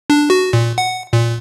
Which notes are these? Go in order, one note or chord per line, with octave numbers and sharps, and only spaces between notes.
D4
F#4
A#2
F#5
A#2